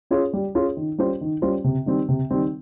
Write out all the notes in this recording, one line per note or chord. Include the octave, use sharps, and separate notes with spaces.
C#4 F4 G#4 C#5
G3
C#4 F4 G#4 C#5
D#3
G3 C#4 F4 C5
D#3
G3 C#4 F4 C5
C3
D#3 G3 C4
C3
D#3 G3 C4